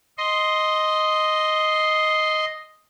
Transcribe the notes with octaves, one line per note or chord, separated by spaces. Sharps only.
D#5 C6